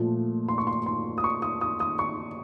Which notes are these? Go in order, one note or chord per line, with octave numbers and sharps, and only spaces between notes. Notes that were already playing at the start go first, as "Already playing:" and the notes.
Already playing: A#2 F3 A3
C6
C#6
C6
C6
D#6
C#6
D#6
D#6
D#6
C#6